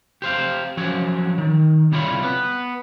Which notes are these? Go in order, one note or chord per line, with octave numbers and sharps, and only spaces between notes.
G4 C5 F5
F3 F#3 C#4 C#5
D#3
C2 G3 E4 F4 C#5 B5
B3 B4